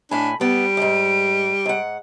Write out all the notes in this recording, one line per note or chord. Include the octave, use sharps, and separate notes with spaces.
A2 D4 G#5 B5
G3 B3 D7
D#2 G#2
G#2 F#5